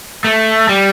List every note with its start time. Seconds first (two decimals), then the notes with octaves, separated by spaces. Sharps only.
0.24 A3
0.69 G3